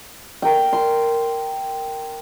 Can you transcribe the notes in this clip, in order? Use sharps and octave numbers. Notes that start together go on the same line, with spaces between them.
A#4 G5
C6